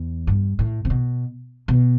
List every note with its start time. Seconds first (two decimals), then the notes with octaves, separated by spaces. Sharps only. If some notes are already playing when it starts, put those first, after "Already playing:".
Already playing: E2
0.27 G2
0.59 A2
0.85 C3
0.90 B2
1.68 B2